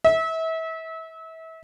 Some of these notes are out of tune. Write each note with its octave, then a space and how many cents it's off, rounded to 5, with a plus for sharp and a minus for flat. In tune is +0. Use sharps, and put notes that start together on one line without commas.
E5 -30